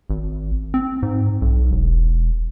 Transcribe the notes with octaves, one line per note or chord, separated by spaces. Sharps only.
G#1
C4
G#2
B1
E1